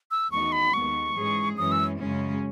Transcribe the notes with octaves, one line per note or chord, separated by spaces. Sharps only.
E6
E2 D#3 A3 D#4 F#4 C#6
B5
D#2 D#3 G#3 B3 C#6
G#2 E3 G#3 C#4 G#4
F#2 E3 G#3 C#4 D#6
E6
F#2 C#3 G#3 C#4